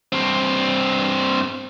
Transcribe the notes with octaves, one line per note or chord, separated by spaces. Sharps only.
G2 C4